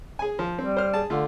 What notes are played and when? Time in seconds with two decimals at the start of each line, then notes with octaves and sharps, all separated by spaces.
0.19 G#4 G#5
0.39 F3
0.59 G3 C4
0.77 C5 F6
0.94 G#4 A5
1.10 D3 A3 F4